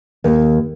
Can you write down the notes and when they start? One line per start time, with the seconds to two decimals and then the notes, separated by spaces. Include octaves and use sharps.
0.24 D#2